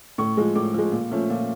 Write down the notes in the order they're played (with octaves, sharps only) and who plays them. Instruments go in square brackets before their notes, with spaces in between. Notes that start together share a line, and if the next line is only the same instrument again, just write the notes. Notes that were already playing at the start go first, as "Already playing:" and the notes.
[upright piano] A2 C#6
F3 G#3
A2 D6
F3 G#3
A#2
F3 A3 C#4
A#2